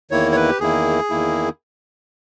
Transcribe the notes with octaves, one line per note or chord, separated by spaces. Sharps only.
E2 D#3 A#3 E4 C#5
C#5
B4
G4
E2 D#3 A#3 E4 G#4
E2 D#3 A#3 E4